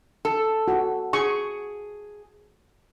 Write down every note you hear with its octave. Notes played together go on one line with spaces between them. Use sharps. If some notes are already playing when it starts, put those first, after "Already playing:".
A4
F#4
G#4 C#6